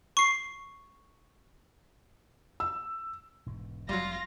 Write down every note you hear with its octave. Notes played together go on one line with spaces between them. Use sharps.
C#6 C7
E6
E1 G#2 B2
F1 F#3 G3 F4 A#6